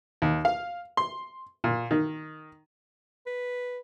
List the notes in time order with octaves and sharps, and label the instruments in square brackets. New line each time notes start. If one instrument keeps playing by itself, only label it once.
[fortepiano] D#2
F5
C6
A#2
D#3
[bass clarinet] B4